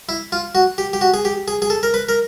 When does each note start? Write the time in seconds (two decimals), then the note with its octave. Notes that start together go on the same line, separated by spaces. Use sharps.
0.09 E4
0.32 F4
0.55 F#4
0.78 G4
0.93 G4
1.01 F#4
1.14 G#4
1.25 G4
1.48 G#4
1.62 G#4
1.70 A4
1.83 A#4
1.94 B4
2.09 A#4